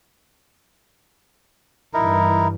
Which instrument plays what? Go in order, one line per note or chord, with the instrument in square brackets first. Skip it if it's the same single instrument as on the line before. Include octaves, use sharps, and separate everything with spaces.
[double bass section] G2 E3 [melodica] D#4 E4 A#4